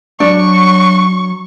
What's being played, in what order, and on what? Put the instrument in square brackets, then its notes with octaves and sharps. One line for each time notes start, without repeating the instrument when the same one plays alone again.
[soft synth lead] F#3 [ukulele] D4 [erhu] C#6